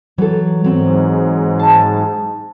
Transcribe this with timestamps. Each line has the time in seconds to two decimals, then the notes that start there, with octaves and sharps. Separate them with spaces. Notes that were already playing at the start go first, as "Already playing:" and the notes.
0.18 E3 F#3 A4
0.64 G#2 F#3 C4
1.59 A5